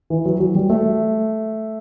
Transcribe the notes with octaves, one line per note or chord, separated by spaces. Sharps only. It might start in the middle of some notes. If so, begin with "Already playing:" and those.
E3
F#3
F#3
G3
A3